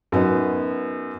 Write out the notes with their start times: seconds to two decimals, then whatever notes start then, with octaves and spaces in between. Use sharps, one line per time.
0.12 F#2 B3 D#4